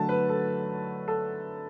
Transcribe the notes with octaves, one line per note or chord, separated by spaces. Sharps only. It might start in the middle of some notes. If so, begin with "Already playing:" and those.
Already playing: D3 F#3 A3 F#5 A5
B4
A4
A4